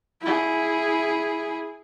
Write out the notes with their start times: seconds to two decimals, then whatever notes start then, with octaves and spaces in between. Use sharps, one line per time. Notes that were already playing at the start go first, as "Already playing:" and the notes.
0.21 E4 G#4